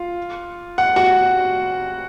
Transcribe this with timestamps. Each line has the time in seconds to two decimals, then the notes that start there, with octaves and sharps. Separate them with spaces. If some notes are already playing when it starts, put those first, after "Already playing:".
Already playing: F4
0.78 F#5
0.96 F#4 F#5